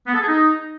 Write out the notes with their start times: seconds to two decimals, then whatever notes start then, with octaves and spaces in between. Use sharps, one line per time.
0.07 B3
0.14 A4
0.20 G#4
0.27 D#4